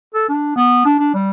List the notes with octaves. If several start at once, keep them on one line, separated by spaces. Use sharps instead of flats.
A4
D4
B3
D4
D4
G3